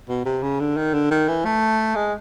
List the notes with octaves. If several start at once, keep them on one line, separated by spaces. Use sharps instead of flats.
B2
C3
C#3
D3
D#3
D3
D#3
E3
A3
G#3